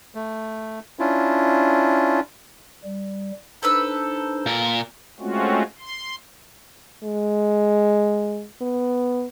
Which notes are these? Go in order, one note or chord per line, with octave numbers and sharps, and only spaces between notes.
A3
C#4 D4 E4 F4
G3
D4 D#4 A4 B4 C5 E6
A#2 A#4
G#3 A3 C4 C#4 F4 F#4
C6
G#3
B3